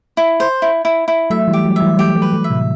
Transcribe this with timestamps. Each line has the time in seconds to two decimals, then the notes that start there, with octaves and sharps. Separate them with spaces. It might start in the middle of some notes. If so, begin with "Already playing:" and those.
0.17 E4
0.40 C5
0.62 E4
0.85 E4
1.08 E4
1.30 F#3 A3 E5
1.48 E3 G3
1.53 G4
1.65 F#3 A3
1.76 E5
1.82 E3 G3
1.99 F#3 A3 G4
2.16 F#3 A3
2.22 B4
2.33 F#3 A3
2.44 E5
2.50 A2 C3